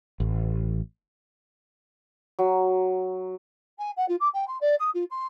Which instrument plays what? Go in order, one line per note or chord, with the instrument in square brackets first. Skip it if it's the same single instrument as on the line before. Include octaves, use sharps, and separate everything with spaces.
[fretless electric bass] A1
[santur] F#3
[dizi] G#5
F#5
F4
D6
G5
C6
D5
D#6
F4
C6